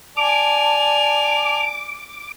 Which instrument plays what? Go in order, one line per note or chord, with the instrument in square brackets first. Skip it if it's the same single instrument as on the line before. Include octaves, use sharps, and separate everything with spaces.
[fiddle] D5 G#5 [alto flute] A5 [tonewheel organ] D6 [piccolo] F7